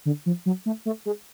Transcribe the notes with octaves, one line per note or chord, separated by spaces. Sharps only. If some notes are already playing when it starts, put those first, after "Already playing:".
D3
F3
F#3
A3
A3
G#3